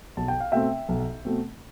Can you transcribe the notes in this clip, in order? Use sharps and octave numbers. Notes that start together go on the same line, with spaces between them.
B1 A5
G5
F5
B2 A3 C4 E5 G5
B1
B2 A3 C4